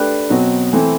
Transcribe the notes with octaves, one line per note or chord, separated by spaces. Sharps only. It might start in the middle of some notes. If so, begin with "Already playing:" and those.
Already playing: A3 D4 G4 B4
B2 F#3 C4 F#4
E3 A3 C4 E4 A4